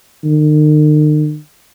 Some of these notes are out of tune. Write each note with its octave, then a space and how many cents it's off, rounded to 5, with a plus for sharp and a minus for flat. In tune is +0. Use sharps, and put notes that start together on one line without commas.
D#3 -45